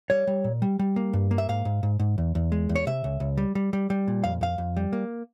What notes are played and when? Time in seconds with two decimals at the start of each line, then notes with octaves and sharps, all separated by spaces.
0.10 G3 C#5
0.27 G3
0.44 A#2
0.62 G3
0.79 G3
0.96 A#3
1.13 G2
1.31 A#3
1.38 E5
1.49 G#2 F5
1.65 G#2
1.83 G#2
1.99 G#2
2.18 E2
2.35 E2
2.52 G#3
2.69 E2
2.75 C#5
2.87 C3 E5
3.04 C#2
3.20 C#2
3.37 G3
3.55 G3
3.73 G3
3.90 G3
4.08 A#2
4.24 F2 F5
4.41 F2 F5
4.58 F2
4.77 G3
4.93 A#3